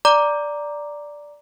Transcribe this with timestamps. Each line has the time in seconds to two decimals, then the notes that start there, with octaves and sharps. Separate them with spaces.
0.05 D5 A#5 D6